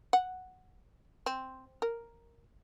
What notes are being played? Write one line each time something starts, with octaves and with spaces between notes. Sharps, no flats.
F#5
C4
A#4